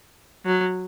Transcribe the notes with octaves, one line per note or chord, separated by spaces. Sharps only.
F#3